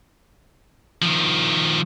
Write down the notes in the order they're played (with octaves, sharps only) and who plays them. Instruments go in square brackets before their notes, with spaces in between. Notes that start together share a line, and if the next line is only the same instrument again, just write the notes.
[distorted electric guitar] D#3 F3